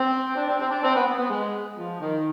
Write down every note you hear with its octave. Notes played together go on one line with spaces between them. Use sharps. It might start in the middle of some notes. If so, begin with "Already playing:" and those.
Already playing: C4
D4
C4
C4
D4
C4
B3
B3
B3
G#3
F3
D#3